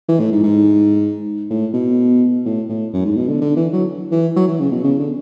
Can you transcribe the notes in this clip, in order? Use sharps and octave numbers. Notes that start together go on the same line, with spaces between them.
E3
A2
G#2
G#2
A2
B2
A2
A2
F#2
G#2
B2
D3
D3
E3
F#3
E3
F#3
E3
C#3
B2
C#3
D3